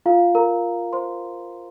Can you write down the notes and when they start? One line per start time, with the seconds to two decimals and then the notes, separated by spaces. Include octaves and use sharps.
0.06 F4 F5
0.35 A#4 A#5
0.93 C5 C6